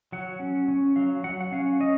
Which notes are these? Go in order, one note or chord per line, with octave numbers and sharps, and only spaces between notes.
F#3 F#5
C#4
C#4
F#3 F5
F#3 F#5
F#5
C#4 F5
C#4 D#5